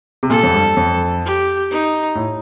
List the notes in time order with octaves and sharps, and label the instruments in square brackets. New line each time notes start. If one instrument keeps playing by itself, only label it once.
[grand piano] C3
[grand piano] A#2 [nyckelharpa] A4
[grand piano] F2
G2
F2
[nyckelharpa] G4
D#4
[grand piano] A2